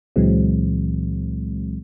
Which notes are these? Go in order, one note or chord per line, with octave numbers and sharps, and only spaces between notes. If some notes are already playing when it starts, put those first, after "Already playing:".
C#2 A#2 E3 F#3 G#3 C4